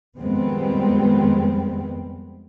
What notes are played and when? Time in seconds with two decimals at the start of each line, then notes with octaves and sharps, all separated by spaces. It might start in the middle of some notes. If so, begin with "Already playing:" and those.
0.18 F2 D#3 G3 G#3 B3 C4